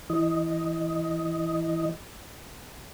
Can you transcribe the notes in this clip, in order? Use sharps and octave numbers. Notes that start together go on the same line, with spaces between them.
E3 D#5